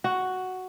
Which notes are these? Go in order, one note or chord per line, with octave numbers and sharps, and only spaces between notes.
F#4